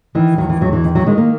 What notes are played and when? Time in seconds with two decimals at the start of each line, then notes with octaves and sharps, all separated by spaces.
0.15 D#3 E3
0.38 E2 F#3
0.49 E3
0.61 E2 F#3
0.73 E3
0.84 D#3
0.95 F#3
1.06 D#3 G#3
1.18 A#3